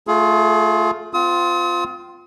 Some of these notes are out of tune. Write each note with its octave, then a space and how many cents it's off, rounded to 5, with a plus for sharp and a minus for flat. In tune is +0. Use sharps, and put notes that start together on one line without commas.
A3 +0 F4 +0 G#4 +30
C4 -35 F4 +0 D#6 +40